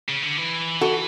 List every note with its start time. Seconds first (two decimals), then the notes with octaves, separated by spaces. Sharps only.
0.08 C#3
0.22 D3
0.37 E3
0.81 F#4 A4